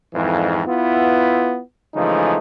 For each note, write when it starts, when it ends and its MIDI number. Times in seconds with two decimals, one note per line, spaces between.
0.14 0.62 41
0.14 0.62 44
0.14 0.62 52
0.67 1.59 59
0.67 1.59 64
0.67 1.59 65
1.94 2.37 49
1.94 2.37 52
1.94 2.37 53
1.94 2.37 56
1.94 2.37 57
1.94 2.37 63